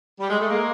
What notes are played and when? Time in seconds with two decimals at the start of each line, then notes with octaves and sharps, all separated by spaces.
0.20 G3
0.30 G#3
0.40 A3
0.50 G#3 A#3